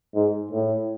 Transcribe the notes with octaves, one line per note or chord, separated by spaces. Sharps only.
G#2
A2